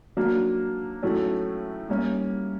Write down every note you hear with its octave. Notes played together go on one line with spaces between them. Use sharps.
F#3 A#3 D4
A2 F#3 A3 C#4
G3 A#3 C#4